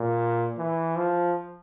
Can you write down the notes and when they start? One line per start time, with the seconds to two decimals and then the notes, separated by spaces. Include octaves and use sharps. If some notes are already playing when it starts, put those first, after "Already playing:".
Already playing: A#2
0.58 E3
0.97 F3